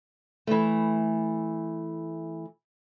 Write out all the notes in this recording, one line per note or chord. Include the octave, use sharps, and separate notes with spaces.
E3 A3